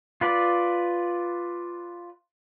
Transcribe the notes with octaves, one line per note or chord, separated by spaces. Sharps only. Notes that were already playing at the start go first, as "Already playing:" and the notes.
F4 B4 D5